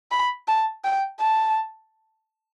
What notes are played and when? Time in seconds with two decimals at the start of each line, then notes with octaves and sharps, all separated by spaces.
0.11 B5
0.48 A5
0.84 G5
1.20 A5